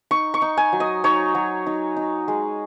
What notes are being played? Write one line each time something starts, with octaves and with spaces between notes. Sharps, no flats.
D#4 C#6
C#6
D#4
G#5
F#3
D#5
D#4 C#5
F#3
D#4
D#4
G#3